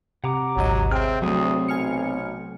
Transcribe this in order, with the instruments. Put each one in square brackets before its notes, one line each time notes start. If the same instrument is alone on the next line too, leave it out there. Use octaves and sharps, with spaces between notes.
[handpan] C3 [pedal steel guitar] F#5 A#5 D6
[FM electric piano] G#1 D2 D#5 [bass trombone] F#3
[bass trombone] C4 [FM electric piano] G#4 [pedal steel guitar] E5 G5 F6
[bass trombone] D2 [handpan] F#3 A3 [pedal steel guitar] C4 C#6 D#6
[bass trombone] B1 [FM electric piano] G#5 F6 C#7